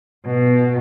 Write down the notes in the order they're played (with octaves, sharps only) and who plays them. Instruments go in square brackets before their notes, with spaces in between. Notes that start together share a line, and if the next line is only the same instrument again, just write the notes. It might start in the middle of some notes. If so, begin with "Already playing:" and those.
[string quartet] B2